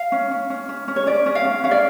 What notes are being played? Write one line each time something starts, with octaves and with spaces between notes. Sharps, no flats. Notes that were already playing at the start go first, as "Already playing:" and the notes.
Already playing: F5
C#4
C#4
C#4
C#4
C#4
C#5
C#4 D5
C#4
F5
C#4
C#4 F5
D5